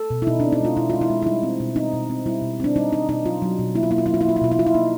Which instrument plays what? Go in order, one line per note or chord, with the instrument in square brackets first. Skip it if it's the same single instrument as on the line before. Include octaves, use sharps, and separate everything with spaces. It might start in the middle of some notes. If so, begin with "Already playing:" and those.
Already playing: [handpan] A4
B2
E4
B2 D#4
C4 D4
D#4
G#3 F4
B2 E4
G#3 F4
E4
G#3
E4
G3 D#4
C4
B2
C4 D#4
B2
C4
G3 E4
B2
C4 D4
G3 D#4
G3 D#4
B2 D#4
F#3 F4
F#3
B2
A#3 E4
F4
A#3 E4
F4
F#3 E4
F4
E4
A#3 F4
E4
B2 F4
E4
B2 F4
E4
A#3 D#4